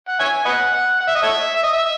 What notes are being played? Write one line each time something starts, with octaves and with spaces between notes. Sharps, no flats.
F#5
C#5 E5 G#5
B4 D#5 F#5
F#5
F#5
E5
D#5
A4 C#5 E5
E5
D#5
E5